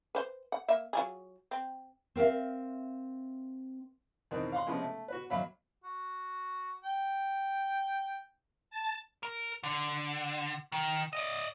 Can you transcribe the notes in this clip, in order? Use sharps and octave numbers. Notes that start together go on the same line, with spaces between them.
B4 C5
F#5
A#3 E5
F#3 F4 G#4
C4
C4 A#4 E5 F5
E2 B2 D#3 C4
F5 F#5 C6
C3 F3 G#3 B3 C#4
A3
F#4 B4
D#2 F#3 E5 F5 B5
F#4
G5
A5
A#4
D3
D#3
D5 D#5